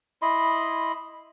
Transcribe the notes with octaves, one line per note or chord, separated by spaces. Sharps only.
E4 D#5 B5 C6